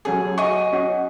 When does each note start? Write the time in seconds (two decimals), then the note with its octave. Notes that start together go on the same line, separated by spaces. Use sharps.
0.05 F#3 C#4 G#4 A4
0.38 F#4 D#5 C#6
0.73 C#4 F#4